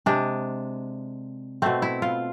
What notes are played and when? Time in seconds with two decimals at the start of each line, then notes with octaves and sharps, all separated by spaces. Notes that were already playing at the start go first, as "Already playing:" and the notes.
0.06 C3 G#3 D4
1.62 B2 A3 C4
1.82 E4
2.02 F4